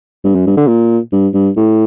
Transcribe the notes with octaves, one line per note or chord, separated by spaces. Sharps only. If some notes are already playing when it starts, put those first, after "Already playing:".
G2
F#2
G2
D3
A#2
G2
G2
A2